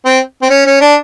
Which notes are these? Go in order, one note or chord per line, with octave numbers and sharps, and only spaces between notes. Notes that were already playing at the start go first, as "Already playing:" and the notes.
C4
C4
C#4
C#4
D4